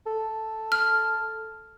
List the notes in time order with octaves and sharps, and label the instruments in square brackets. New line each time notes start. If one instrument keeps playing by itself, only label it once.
[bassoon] A4
[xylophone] F6